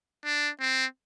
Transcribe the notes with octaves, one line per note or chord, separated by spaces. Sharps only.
D4
C4